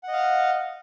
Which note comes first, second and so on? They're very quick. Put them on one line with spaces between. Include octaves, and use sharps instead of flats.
F#5 D#5 F5